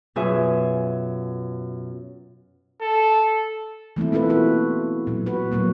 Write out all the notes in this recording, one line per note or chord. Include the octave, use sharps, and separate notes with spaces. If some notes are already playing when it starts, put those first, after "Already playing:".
F#2 B2 F4 G#4 E5 G#5
A4
E3 A3 C4 E4
A#3 B3 F4 A4 B4
E4 F#4 B4
A#2 F#3
F#4 B4
A#2 F#3 A#3 B3